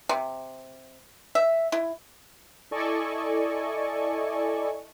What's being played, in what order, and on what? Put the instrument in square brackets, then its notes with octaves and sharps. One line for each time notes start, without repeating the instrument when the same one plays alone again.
[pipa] C3
E5
E4
[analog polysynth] E4 A4 D5 D#5 G#5 C#6